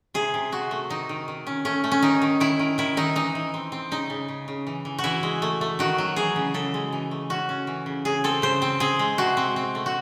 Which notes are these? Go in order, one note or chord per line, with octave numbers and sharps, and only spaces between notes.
C3 G#4
C3
C3 F#4
A3
D#3 D#4
D#3
D#3
C#4
A3 C#4
A3
C#4
D#3 D#4
D#3
D#3 E4
D#3
D#3 E4
D#3 D#4
E3 D#4
E3
C4
C4
C#3 D#4
C#3
C#3
C#3
E3
E3
F#4
E3 E4
G#3
A3
A3
D#3 F#4
F#3
E3 G#4
C#3
C#3 A4
G#3
E3
A3
C#4 F#4
C#4
E3
C#3
C#3 G#4
C4 A4
C#3 C5
C4
C4 G#4
G#3
C3 F#4
C4
C4
A3
F#4